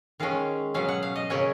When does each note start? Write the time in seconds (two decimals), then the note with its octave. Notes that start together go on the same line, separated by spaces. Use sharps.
0.20 D#3 G#3 C#4 F5
0.74 B2 F#3 C#4 F5
0.88 F#5
1.03 F5
1.16 D#5
1.30 C#3 F#3 A#3 C#4 C#5